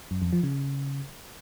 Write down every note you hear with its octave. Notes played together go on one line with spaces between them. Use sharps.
F#2
F2
F3
C#3